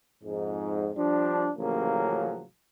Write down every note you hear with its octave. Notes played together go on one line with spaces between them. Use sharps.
F2 G#2
F3 G3 D4
A1 C#3 F3 F#3 A#3